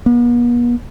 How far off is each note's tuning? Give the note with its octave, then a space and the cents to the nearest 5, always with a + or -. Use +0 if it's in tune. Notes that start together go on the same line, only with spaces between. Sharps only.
B3 -45